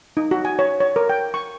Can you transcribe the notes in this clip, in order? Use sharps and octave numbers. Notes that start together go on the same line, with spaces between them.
D#4
F#4
G#5
C#5
C#5
A#4
G5
C#6